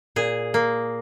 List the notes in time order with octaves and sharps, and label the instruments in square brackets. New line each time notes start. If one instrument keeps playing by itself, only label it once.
[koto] A#2 G#4
A#3